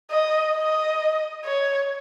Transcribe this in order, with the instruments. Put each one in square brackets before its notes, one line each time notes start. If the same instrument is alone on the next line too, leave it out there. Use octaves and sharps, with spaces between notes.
[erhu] D#5
D#5
C#5